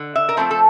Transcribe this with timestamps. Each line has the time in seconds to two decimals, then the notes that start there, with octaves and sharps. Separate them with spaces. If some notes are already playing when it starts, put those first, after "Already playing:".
Already playing: D3
0.16 E5
0.29 A#4
0.37 F3 A3 C4 C5
0.51 A4